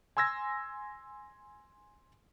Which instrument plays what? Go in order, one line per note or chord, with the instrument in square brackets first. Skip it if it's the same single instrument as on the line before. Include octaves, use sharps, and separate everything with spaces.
[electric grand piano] G#5 C6 E6 G#6 A#6